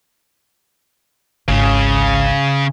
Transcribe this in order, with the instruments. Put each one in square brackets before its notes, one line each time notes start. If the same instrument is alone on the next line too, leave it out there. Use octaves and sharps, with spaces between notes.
[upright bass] G#1 C#2 [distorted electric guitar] C#3